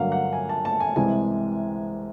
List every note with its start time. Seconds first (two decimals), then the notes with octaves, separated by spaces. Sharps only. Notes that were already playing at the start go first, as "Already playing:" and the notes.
Already playing: G2 D3 F#3 A#3 F5 F#5
0.12 F#5
0.33 G#5
0.49 A5
0.65 A5
0.80 G#5
0.96 C2 C3 E3 G#3 G#5